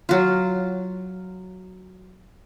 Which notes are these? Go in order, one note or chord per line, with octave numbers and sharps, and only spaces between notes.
F#3 F4